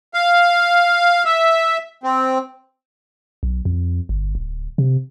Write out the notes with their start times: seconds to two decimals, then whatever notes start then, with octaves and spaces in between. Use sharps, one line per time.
0.14 F5
1.25 E5
2.04 C4
3.43 B1
3.65 F2
4.09 G1
4.35 D1
4.78 C3